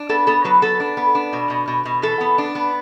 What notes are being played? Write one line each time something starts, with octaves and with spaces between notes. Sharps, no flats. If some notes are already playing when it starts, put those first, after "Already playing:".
Already playing: D4
B3 A4
B3 A4
F#3 B4
B3 A4
D4
B3
D4
B2
B2
B2
B2
E3 A4
B3
D4
B3